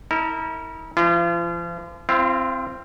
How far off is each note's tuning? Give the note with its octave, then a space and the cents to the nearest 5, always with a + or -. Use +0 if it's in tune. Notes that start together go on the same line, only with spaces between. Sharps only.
E4 -40 A#4 -30
F3 -40 F4 -35
C4 +0 F4 -45 F5 +0